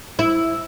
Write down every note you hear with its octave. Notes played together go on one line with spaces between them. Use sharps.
E4